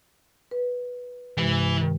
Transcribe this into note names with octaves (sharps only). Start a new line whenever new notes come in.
B4
G2 C3 E3 G#3